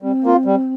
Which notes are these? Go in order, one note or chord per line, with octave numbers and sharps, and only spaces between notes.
G3 C4
A#3 F4
G3